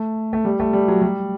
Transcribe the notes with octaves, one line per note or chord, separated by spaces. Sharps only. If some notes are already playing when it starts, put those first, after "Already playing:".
Already playing: A3
A3
G3
A3
G3
F#3
G3